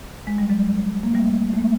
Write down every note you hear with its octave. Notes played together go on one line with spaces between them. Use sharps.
G#3
G3
F#3 G#3
A#3
G3 A3
A3
G#3 A#3